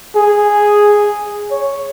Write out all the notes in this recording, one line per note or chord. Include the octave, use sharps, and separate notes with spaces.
G#4
C#5